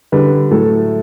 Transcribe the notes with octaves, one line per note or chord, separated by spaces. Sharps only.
D3 G3 B4
A2 F#3 A3 A4